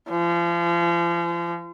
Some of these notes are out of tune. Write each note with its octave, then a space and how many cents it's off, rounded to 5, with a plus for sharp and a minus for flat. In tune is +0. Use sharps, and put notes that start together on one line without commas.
F3 -35